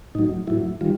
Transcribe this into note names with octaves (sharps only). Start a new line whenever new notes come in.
A2 F#3 D#4
A2 F#3 E4
D#3 G3 F4